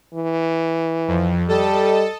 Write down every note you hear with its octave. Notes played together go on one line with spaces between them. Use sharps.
E3
F2
G3 A4 D#5 A5